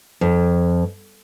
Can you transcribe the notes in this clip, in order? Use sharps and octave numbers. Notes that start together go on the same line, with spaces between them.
F2